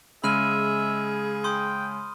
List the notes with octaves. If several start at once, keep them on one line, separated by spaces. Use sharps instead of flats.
C#3 G#3 G#4 E5 B5 F6 D#7
G5 C6 D#6